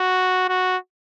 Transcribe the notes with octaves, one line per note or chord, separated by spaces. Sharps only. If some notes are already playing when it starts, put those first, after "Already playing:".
Already playing: F#4
F#4